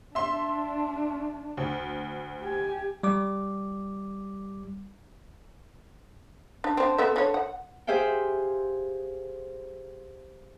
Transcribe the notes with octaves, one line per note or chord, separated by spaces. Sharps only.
D4 E5 C6
D2
G4 G#5
G3 D6
D4
C4 D4
B3 A4 E5
D3 C#5
F#5
G4 G#4 C5 E5 F5 G5